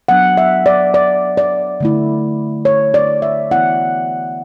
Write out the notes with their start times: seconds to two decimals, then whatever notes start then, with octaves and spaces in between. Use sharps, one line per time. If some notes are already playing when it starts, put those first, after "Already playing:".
0.08 F#3 B3 D4 F#5
0.37 E5
0.66 D5
0.94 D5
1.37 D5
1.80 D3 A3 E4
2.65 C#5
2.94 D5
3.22 E5
3.51 E3 B3 E4 F#5